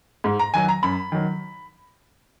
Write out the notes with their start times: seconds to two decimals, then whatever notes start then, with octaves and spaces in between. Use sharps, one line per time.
0.24 G#2
0.39 A#5
0.54 D#3 F#3 G#5
0.68 A#5
0.83 F#2 B5
1.12 D#3 F#3